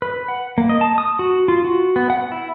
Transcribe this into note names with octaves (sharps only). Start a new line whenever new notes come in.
B4
F#5
A#3
D#5
A5
D#6
F#4
F4
F#4
B3
F#5
E4